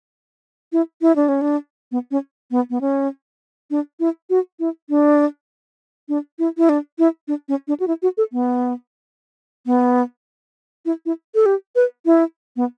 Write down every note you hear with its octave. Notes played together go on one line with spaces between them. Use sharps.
E4
E4
D4
C#4
D4
B3
C#4
B3
B3
C#4
D4
E4
F#4
E4
D4
D4
E4
E4
D4
E4
D4
C#4
D4
F#4
E4
F#4
A4
B3
B3
E4
E4
A4
G4
B4
E4
B3